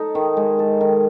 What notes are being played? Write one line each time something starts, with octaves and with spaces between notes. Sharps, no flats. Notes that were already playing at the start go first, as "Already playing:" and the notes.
Already playing: D#4 A4
D#3
G#3
A4
D#3